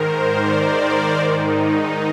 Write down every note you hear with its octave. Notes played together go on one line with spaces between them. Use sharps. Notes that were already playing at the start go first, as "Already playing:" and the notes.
Already playing: G#2 D#3 A#4 C5
D5
A#4
G#2 D#3 D#4